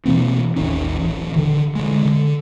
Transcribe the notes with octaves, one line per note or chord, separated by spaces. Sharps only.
B2 E3 A#3 C4
D#1 A1 D#3 C#4
D1 E3
D3 D#3
D3 G#3
D3